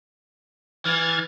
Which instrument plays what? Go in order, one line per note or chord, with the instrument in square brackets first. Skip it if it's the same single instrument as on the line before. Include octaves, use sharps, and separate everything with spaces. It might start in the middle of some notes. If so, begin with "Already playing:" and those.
[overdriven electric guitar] E3 [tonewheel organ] F6 G#6 A6